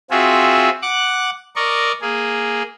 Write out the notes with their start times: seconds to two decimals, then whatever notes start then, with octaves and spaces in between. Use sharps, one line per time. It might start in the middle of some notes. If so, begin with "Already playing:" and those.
0.11 C4 F4 F#4 G#4 E5
0.82 F#5 D6 F#6
1.56 A#4 D5 D#5 C#6
2.02 A#3 G#4